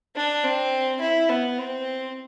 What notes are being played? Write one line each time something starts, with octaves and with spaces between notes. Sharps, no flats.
D4
C4
E4
B3
C4